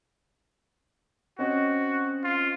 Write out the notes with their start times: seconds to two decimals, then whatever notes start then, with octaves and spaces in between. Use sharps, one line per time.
1.39 C4 C#4 F#4 D#5
2.24 F4